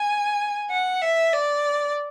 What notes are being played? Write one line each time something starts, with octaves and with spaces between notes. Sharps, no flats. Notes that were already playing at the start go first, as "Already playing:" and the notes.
Already playing: G#5
F#5
E5
D5